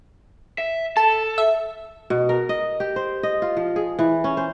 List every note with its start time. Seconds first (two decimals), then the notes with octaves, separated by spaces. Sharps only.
0.58 E5
0.97 A4 A5
1.38 E5
2.10 B2
2.29 A#4
2.49 D#5
2.80 G4
2.96 C5
3.23 D#5
3.42 F4
3.57 F3
3.76 G#4
3.99 E3
4.24 C#4
4.37 C5